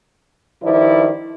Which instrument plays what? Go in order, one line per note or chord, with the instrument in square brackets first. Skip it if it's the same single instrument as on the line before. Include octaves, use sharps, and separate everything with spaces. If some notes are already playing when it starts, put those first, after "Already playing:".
[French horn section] G2 D#3 F3 E4 D5